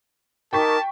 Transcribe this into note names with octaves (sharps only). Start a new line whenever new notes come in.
D#4 A#4 G5 A5 C#6 D6 B6